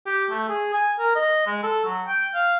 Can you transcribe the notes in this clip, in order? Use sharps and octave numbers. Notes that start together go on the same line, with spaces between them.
G4
A3
G#4
G#5
A#4
D#5
G#3
A4
F#3
G5
F5